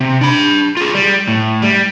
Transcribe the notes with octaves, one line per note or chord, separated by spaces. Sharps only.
C3
D4 B5
F4 G#4
G3
A2
G3